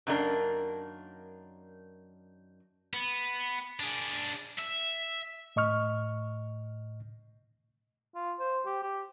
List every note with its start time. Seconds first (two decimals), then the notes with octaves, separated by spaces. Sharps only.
0.07 F#2 D#3 A#3 D4 A#4
2.94 B3
3.80 D4 G#4
4.59 E5
5.56 A2 D#5 C#6 F6
8.15 F4
8.39 C5
8.66 G4
8.83 G4